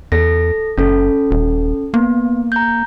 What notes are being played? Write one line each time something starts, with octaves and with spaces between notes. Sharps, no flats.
E2 A4 A#6
F#1 C#4 A4
D#1
A#3 B3
A#5 G6